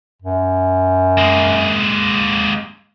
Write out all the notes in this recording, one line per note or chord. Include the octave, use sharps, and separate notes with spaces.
F#2
G#3 A#3